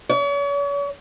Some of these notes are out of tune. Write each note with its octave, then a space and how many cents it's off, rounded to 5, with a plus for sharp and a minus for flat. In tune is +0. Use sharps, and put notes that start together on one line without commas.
C#5 +40